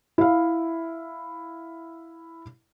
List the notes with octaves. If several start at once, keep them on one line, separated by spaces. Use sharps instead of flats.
E4 F5